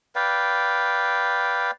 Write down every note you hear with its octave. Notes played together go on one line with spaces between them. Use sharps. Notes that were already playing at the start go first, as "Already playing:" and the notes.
B4 D5 F5 G5